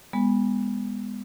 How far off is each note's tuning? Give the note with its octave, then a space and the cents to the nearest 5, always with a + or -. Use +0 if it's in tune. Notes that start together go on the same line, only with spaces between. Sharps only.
G#3 -30 B3 -5